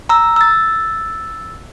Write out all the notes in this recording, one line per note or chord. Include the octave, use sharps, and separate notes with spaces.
A#5 E6
E6 A6